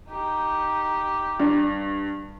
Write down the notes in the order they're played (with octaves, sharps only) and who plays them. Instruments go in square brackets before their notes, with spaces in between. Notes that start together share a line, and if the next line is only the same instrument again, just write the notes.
[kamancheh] D#4 G4
[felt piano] G2